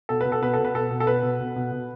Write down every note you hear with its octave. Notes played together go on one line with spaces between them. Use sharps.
B2 A4
B2 B4
A4
B2 B4
A4
B2
B4
B2 A4
B2
A4
B2 B4
B2
B2
B2
B2